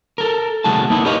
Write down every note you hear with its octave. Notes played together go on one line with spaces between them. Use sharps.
A4 A#4
C2 D#3 G#3 A3 F#4 A5
A#3 B3 D#4 E4
G4 A#4 B4 C#5 D#5 F5